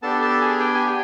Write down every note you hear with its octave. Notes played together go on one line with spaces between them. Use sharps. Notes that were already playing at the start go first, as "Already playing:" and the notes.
B3 D4 G4 A4 A5
A4 A5
G#4 G#5
G5
G#5
G4 G5